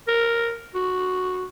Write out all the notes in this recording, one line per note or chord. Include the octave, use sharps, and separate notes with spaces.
A#4
F#4